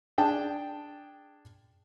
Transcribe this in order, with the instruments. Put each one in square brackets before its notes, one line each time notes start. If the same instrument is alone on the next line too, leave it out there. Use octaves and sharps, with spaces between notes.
[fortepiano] D4 G#4 G5 A5